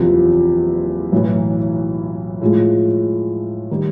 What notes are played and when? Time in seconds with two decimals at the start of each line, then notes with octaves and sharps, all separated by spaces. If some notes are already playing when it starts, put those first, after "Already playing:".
Already playing: F#1 E2 C3 F3
1.12 B1 A2 E3
2.41 A2 F3 G#3
3.71 D#3 G3